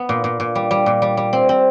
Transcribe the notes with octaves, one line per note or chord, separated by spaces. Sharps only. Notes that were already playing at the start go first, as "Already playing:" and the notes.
Already playing: B3
A#2
A#2
A#2
G3
G3
A#2
G3
G3
C4
C4